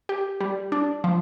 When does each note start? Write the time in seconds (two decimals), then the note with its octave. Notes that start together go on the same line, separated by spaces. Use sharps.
0.09 G4
0.40 G3
0.72 D4
1.04 F3